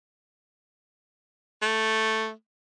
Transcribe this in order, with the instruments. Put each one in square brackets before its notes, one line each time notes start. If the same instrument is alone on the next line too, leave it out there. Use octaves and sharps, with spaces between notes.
[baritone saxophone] A3